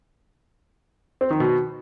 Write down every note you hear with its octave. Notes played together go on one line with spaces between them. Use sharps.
C4
D#3
B2